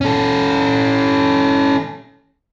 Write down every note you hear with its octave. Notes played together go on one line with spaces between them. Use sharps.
C#4 A4